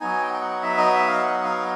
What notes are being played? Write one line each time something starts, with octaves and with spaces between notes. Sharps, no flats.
F#3 B3 D#4 G#5
G5
G5
F#5
E5
D#5
E5
F5
F#5
F5